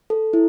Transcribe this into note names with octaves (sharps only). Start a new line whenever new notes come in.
A4
E4